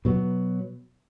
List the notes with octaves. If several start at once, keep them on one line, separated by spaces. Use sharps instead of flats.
B2 F#3 B3